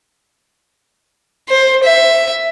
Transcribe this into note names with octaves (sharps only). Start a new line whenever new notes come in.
C5
E5